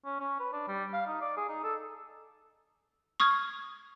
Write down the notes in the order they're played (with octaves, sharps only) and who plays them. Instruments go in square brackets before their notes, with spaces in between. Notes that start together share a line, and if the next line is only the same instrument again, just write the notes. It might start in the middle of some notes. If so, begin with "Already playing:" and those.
[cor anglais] C#4
C#4
B4
D4
G3
F5
D#4
D5
G#4
D#4
A4
[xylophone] C#6 D#6 F6 G#6